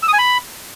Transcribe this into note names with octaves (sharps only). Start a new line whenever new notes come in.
E6
D#6
G#5
B5